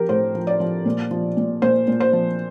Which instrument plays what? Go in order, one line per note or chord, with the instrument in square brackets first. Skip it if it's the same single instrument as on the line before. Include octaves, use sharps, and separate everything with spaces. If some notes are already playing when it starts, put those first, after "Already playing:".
Already playing: [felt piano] F3 G4 A#4
A2 C5
F3
D5
F3
A#2
F3
A#2
A#2 C5
A#2
C5
F3